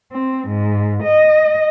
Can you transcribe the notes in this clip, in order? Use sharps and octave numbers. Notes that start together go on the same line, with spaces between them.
C4
G#2
D#5